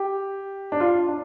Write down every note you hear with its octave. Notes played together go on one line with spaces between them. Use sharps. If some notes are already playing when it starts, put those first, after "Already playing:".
Already playing: G4
D4
F4
D4